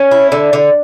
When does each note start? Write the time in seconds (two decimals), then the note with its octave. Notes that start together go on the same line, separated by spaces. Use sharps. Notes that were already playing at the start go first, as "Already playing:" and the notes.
Already playing: C#4
0.11 E4
0.32 D3
0.53 D3